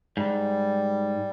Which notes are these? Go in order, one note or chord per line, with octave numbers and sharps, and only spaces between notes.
G#2 G3